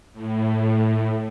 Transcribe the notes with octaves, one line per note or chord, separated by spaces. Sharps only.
A2